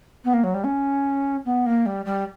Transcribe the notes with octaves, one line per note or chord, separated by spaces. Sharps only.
B3
A#3
F#3
G3
C#4
B3
A#3
G3
G3